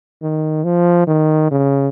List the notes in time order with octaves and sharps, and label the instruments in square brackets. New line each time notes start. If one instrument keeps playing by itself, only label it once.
[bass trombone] D#3
F3
D#3
C#3